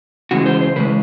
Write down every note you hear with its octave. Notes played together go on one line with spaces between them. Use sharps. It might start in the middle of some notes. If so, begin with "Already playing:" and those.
C#3 E3 G#3 F#4
C5
C5
C#3 E3 G#3 B4